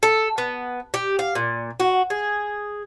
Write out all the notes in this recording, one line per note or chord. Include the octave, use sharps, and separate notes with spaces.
A4
B3
G4
F5
A#2
F#4
G#4